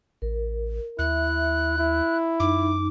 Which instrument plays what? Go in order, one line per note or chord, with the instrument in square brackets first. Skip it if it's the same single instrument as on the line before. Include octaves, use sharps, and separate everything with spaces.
[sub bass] A1 [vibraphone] A#4
[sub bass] D#2 [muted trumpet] E4 [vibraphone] E5 [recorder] F#6
[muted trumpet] E4
[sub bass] F#2 [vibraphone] D#4 [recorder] D6